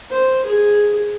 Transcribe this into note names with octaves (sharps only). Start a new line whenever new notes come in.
C5
G#4